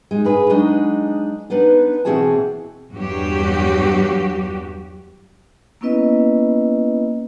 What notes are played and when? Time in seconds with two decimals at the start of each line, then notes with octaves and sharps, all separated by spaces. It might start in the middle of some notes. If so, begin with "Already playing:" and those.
0.11 G#3 D#4
0.25 G2 G#4 B4
0.50 F#3 G#3 D4 D#4 D#5
1.50 B3 D4 D#4 B4
2.05 B2 E3 C4 F#4 G#4 A5
2.93 E2 G2 F#3 F#4 G4
5.81 A#3 B3 C#4 E4 B4 D#5